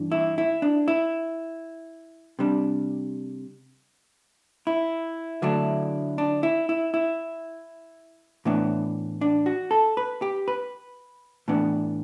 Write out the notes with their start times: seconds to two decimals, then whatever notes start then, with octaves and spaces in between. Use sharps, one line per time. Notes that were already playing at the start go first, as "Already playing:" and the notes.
Already playing: G2 E3 D4
0.12 E4
0.38 E4
0.62 D4
0.88 E4
2.39 C3 G3 D4
4.67 E4
5.42 D3 F#3 A3 D4
6.18 D4
6.43 E4
6.69 E4
6.94 E4
8.45 A2 E3 B3 D4
9.21 D4
9.46 F#4
9.71 A4
9.97 B4
10.22 G4
10.48 B4
11.48 A2 E3 B3 D4